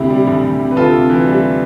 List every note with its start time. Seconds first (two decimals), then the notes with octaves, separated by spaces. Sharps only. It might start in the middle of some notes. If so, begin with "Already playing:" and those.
Already playing: D2 C3 E4 G4
0.10 G3
0.27 D2
0.43 D2
0.60 C3
0.71 B4
0.76 D2 F4 A4
0.93 C3
1.10 E3
1.26 G3